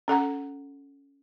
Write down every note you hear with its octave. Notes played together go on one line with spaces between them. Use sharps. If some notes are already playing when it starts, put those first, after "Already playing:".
C#4 A4 F#5 A#5